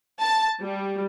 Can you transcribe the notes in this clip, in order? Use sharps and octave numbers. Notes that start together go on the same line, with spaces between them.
A5
G3